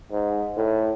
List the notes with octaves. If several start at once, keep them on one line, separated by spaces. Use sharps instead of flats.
G#2
A2